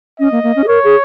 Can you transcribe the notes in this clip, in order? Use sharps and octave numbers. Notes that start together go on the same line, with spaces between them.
C#4 D#5
A#3
A#3
C#4
G#4
A#4 C#5
G#4